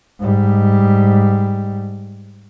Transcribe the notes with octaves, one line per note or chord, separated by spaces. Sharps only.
G#2 G3